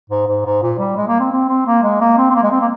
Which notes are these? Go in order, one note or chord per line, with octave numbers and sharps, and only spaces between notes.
G#2
G#2
G#2
A#2
G3
G#3
A#3
C4
C4
C4
A#3
G#3
A#3
C4
C4
A#3
G#3
C4
A#3